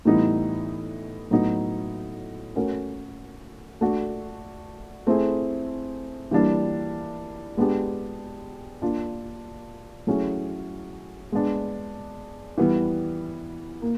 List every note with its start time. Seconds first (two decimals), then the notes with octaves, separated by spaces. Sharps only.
0.05 A2 E3 G3 B3 D#4
1.31 A2 F#3 B3 D#4
2.55 A3 C#4 F#4 A#4
3.81 A3 D4 F#4
5.07 A3 C4 E4 G#4
6.31 E3 G3 A#3 D4
7.57 G#3 B3 D4 G4
8.82 A#3 D4 F4
10.07 F#3 A3 C#4 E4 G#4
11.32 G#3 B3 D4
12.58 E3 G3 B3
13.82 A#3